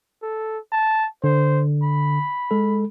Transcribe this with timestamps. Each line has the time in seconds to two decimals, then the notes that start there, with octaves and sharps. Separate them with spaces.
0.23 A4
0.72 A5
1.24 D3 C5
1.83 B5
2.51 G#3 A4